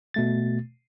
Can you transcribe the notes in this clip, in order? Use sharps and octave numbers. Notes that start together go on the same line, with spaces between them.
B2 A3 A6